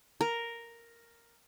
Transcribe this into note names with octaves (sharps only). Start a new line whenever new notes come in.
A#4